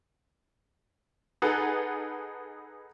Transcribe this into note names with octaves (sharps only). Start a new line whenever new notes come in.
D#4 G#4 A4 B4 F#5